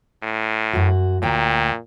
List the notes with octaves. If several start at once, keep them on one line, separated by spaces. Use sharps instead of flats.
A2
F#2 F#4
D2 A#2 G5 A#5